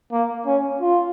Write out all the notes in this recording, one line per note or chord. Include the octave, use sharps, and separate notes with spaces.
A#3
C#4
F4